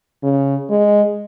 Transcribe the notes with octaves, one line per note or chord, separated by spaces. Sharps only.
C#3
G#3